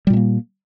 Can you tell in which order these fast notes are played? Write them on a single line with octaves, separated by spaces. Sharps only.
G3 A#2 A3 A#3